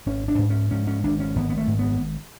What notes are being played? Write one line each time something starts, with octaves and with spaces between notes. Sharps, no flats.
G#1 C#4
D4
G#2
C#4
G#2 C#4
C#4
G#1 D4
C#4
G#1 B3
B3
A3
G#2
B3